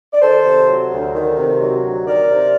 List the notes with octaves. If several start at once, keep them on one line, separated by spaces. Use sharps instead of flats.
D5
D#3 A4 C5
C3
F#3
D2
D#3
C3
F#3
D2
D#3 A#4 D5
C3